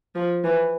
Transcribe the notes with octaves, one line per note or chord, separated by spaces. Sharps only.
F3
E3